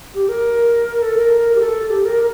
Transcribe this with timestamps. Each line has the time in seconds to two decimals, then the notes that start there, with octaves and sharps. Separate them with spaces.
0.15 G4
0.29 A#4
1.02 A4
1.16 A#4
1.55 G4
1.61 A4
1.90 G4
2.05 A#4